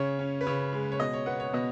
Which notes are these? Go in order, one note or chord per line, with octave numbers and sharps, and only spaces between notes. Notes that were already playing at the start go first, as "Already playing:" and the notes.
Already playing: C#3 C#5
C#4
B4
C#3 C#5
G#3
C#5
B2 D#5
C#5
B3 F#5
C#5
B2 D#5